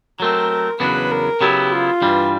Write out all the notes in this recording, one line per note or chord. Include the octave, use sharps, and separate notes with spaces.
F#3 A3 C4 A#4
E2 C#3 F#3 B3 D4 B4
A#4
C#3 F#3 B3 E4 G4
F4
G2 E3 G3